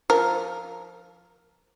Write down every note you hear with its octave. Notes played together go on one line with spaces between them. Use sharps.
F3 A#4